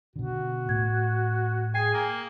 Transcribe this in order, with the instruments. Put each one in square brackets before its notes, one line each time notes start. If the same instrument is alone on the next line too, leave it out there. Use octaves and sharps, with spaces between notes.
[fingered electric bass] B2 D3 [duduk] F#4
[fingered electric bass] A2 [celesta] G#6
[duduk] G#4 [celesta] G5 C7 [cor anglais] G#5
[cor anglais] A#3